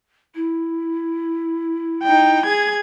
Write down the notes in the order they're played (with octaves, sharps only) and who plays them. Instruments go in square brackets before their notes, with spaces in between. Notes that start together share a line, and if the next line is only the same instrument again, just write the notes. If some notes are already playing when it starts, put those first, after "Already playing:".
[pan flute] E4
[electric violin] D#4 G5
G#4 G#6